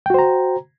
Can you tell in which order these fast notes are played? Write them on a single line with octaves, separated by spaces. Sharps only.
G5 F#4 C5 A#5